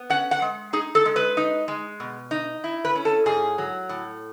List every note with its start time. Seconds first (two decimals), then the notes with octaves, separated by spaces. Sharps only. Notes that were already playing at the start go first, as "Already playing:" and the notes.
Already playing: B3
0.10 C#4 F#5
0.31 F#5
0.42 G#3
0.73 D#4 G#4
0.95 A4
1.05 G#3
1.16 B4
1.37 D#4
1.68 G#3
2.00 B2
2.31 D#4
2.64 E4
2.85 B4
2.95 C#4
3.05 A4
3.26 G#2 G#4
3.58 F#3
3.89 A2